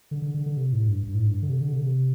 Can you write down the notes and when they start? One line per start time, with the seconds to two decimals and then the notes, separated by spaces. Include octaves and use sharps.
0.11 D3
0.22 D3
0.34 D3
0.46 D3
0.57 C3
0.73 A2
0.88 G2
1.03 G2
1.15 A2
1.27 G2
1.42 D3
1.49 C3
1.61 D3
1.73 C3
1.79 D3
1.84 C3